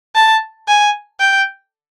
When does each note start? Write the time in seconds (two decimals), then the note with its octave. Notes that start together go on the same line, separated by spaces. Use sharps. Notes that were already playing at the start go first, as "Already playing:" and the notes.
0.15 A5
0.68 G#5
1.20 G5